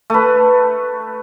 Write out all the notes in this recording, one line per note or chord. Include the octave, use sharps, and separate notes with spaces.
A3 B4